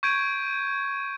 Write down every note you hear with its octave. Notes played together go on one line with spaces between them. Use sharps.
C#6 G6 G#6 D7 D#7